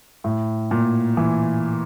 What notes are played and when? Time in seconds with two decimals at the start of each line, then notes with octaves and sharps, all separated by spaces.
0.24 A2
0.71 A#2
1.17 E3